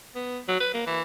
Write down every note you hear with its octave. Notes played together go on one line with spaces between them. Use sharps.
B3
F#3
B4
A#3
E3